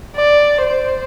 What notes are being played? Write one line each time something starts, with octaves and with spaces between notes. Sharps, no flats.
D5
C5